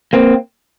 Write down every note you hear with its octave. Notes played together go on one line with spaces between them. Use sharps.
A#3 C4